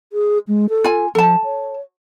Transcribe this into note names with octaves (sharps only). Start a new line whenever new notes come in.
G#4
G#3
A4
F4 G#5
F3 A4 A5
C#5